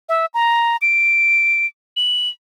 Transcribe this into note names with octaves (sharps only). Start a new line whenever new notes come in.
E5
A#5
D7
F#7